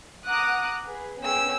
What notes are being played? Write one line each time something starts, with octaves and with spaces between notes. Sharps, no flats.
F#5 A#5 D6 D#6 F#6
G#4 B4
B3 C#4 G#4 G5 E6